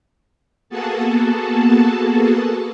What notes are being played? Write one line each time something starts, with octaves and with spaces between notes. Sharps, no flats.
A#3 B3 F#4 G#4 A4 A5